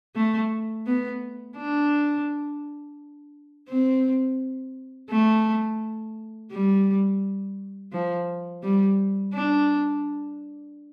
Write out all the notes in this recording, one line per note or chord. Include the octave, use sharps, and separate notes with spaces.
A3
B3
D4
C4
A3
G3
F3
G3
D4